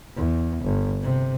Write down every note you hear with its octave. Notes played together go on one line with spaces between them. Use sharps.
E2
G1
C3